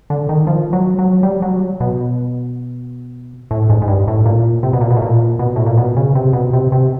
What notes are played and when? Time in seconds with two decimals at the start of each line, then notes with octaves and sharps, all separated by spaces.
0.10 D3
0.29 D#3
0.47 F3
0.73 F#3
0.99 F#3
1.23 G3
1.42 F#3
1.80 B2
3.51 A2
3.70 G#2
3.82 G#2
3.88 G2
4.08 A2
4.26 A#2
4.63 C3
4.73 B2
4.81 A#2
4.90 B2
4.97 A2
5.02 A#2
5.39 B2
5.56 A2
5.66 A#2
5.78 B2
5.96 C#3
6.15 C3
6.33 B2
6.53 C3
6.72 C3